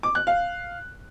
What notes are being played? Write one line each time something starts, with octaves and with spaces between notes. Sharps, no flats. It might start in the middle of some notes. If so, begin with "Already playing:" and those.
D6
F#6
F5